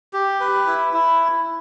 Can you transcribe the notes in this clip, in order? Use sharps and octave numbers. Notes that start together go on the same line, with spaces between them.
G4
B4
E4
E4